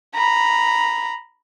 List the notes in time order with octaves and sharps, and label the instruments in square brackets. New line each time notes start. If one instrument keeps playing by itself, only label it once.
[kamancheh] A#5 B5